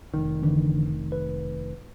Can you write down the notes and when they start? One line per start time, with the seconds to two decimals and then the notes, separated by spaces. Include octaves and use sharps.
0.14 F1 C2 D#3
0.42 D3 E3 D4
1.12 B4